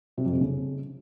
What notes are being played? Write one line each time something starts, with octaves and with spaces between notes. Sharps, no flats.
C3
F2
C3
C#3